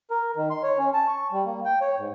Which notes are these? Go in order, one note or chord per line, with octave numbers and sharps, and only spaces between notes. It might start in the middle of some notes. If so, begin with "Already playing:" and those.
A#4
D#3
C6
C#5
C#4
A5
C#6
G3
A#3
G5
C#5
G#2